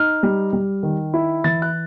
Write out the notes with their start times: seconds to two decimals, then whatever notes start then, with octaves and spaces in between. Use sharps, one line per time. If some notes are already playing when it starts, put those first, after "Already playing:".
Already playing: D#4 F6
0.23 G3
0.53 G3
0.83 D#3
1.14 E4
1.44 E3 A6
1.62 F#6